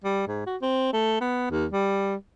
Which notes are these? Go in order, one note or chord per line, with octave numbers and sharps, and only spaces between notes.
G3
G#2
F#4
C4
A3
B3
D#2
G3